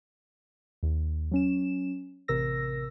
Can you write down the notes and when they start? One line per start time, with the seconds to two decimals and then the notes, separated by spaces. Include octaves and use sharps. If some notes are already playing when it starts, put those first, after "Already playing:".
0.83 D#2
1.31 F#3 C#4 E7
2.28 A1 C3 A#4 E6 A#6